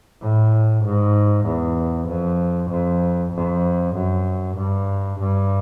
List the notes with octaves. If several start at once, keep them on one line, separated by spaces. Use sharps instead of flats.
A2
G#2
E2
F2
F2
F2
F#2
G2
G2